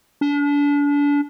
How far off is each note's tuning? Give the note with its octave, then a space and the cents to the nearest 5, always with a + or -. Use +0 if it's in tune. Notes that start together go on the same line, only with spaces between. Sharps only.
D4 -35